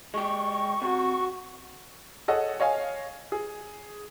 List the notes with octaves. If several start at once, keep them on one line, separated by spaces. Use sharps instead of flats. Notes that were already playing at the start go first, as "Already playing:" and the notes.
G#3 G4 C#6
C3 F#4
G#4 A4 C#5 D#5 F#5
C#5 D#5 F5 G#5
G#4